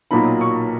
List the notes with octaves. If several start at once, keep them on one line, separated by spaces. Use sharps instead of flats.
B1 A#2 F#3 A#3 D#4 B5
C#6